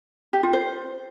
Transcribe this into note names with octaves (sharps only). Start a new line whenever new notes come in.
G4
F4
C5